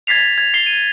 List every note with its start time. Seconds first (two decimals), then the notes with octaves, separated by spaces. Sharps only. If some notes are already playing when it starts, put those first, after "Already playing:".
0.07 G#6 A6 B6 C7 F7
0.38 G#6
0.54 C7 G7
0.66 D#7